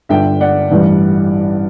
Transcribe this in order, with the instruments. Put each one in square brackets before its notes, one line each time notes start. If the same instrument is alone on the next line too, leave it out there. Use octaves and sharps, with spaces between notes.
[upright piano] G1 G2 D3 E5 G5
D5 F#5
A1 G2 E3 G3